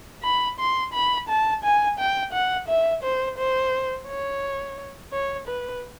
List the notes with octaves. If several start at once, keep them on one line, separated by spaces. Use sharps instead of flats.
B5
C6
B5
A5
G#5
G5
F#5
E5
C5
C5
C#5
C#5
B4